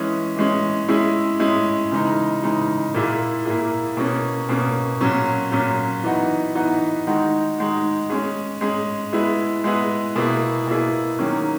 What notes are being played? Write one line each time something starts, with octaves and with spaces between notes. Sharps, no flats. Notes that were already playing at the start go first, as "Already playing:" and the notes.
Already playing: E3 G#3 C#4
E3 G#3 C#4
G#3 C#4 E4 G#4
G#3 C#4 E4 G#4
C#3 E3 G#3 D#4
C#3 E3 G#3 D#4
A#2 A#3 E4 G#4
A#2 A#3 E4 G#4
B2 A#3 C#4
B2 A#3 C#4
A#2 F#3 C#4
A#2 F#3 C#4
E3 B3 D#4 F#4
E3 B3 D#4 F#4
D#3 G#3 D#4 F#4
D#3 G#3 D#4 F#4
G#3 C#4 G#4
G#3 C#4 G#4
G#3 B3 E4 G#4
G#3 B3 E4 G#4
B2 A#3 E4 G#4
B2 A#3 E4 G#4
D#3 F#3 A#3 C#4